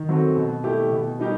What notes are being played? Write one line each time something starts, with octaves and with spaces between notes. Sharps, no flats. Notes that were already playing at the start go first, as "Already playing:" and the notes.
Already playing: D#3
F#3 C4 F#4 A4
B2
A3 E4 G4
B2
G3 D#4 G4